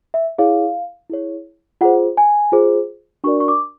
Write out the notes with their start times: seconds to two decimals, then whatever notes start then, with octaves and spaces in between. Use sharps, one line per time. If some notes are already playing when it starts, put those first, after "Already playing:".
0.14 E5
0.38 E4 G#4 C#5 F5
1.10 E4 G#4 C#5
1.81 F4 G#4 C5 F#5
2.17 G#5
2.52 F4 G#4 C5
3.24 D4 F#4 A#4 D5 C#6
3.40 C#6
3.48 D6